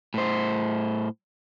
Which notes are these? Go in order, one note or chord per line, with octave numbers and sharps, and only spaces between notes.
A2 C5